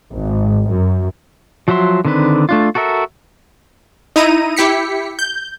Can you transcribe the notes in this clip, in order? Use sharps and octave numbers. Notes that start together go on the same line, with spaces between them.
G#1
F#2
F3 F#3 F#4 E5 C6
D3 D#3 C4 D4 B4
A3 D4 F4
F#4 A4 A#4 E5
D#4 E4 A#5 D#7
E4 G4 B6 C#7
G6